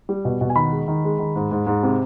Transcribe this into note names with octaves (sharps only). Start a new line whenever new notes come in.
G3
B2
B2
G#5
D#3 B5
G#3
D#3
G#3
D#3
G#2
G#2
G#2
C3